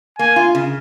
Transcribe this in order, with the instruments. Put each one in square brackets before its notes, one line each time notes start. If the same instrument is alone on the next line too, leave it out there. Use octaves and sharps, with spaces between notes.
[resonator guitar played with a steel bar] A#3 [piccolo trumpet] G#5
[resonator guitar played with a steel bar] F4
C#3